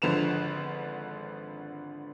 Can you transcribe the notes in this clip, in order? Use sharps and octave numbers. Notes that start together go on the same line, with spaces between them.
G#1 D3 F3 B4 E7 F7